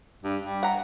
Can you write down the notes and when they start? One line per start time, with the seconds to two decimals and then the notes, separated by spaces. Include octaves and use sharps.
0.23 G2
0.43 G3
0.63 F#5 A#5